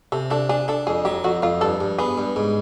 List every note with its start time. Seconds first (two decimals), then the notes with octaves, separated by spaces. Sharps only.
0.12 C3 A4
0.30 D4 A4
0.49 D4 G#4
0.68 D4 A4
0.87 F2 G#4
1.05 F#3 G4
1.24 F2 F#4
1.42 F2 F4
1.61 G2 A4
1.80 G2
1.98 B3 G#4
2.18 G2
2.36 G#2